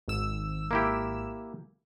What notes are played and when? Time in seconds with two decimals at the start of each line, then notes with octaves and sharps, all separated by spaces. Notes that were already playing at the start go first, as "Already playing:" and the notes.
0.08 G#1 E6
0.71 A#3 E4 G4